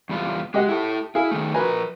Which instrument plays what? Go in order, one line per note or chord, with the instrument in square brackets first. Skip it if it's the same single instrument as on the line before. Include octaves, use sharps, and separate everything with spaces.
[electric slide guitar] E2 G3 F4
[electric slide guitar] G#3 [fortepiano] G4 D#5 F#5
[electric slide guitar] E4 A4
[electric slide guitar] E4 [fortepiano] G#4 F5
[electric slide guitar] D#3 A3
[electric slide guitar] F3 A#4 [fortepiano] B4 G#5